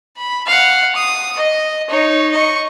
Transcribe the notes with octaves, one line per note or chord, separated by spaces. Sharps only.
B5
F5 F#5
D#6
D#5
D#4 C#5
D#5 C#6